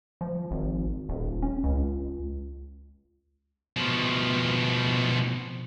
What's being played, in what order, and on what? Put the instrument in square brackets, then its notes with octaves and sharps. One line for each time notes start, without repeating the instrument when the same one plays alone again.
[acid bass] F3
G#1
D#1
C#4
C#2
[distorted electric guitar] B2 F3